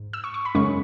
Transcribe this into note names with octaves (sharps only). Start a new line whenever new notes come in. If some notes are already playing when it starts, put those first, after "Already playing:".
Already playing: G#2
E6
C#6
C#6
B5
F#2 C#3 G#3 C#4 C#6